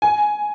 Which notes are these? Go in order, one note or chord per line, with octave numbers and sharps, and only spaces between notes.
G#5